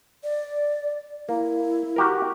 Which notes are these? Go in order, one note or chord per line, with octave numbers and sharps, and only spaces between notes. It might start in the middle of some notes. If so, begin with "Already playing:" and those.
D5
A#3 E4
F#4 G4 A#4